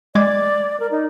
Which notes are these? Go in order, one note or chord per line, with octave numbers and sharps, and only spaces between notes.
G#3 D5 D6 G#6
A#4
D#4